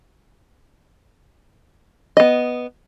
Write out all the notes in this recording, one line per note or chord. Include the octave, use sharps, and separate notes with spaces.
B3 D#5